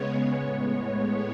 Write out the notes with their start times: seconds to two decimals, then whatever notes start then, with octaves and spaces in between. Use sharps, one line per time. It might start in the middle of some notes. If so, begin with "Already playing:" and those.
Already playing: C#3 G#3 B3 C#5
0.40 A2 G#3 B3